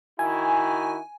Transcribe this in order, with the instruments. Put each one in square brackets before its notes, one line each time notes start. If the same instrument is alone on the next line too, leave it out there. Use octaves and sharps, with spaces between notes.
[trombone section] D#3 E4 F#4 [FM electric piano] G#5